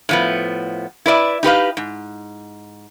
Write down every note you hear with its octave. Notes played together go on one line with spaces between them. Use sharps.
A2 F3 B3
E4 B4 D5 E5
D#4 G4 B4 F5
G#2